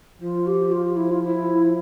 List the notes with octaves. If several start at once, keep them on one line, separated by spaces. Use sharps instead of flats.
F3 F4
G4
F4
E4
F4
E4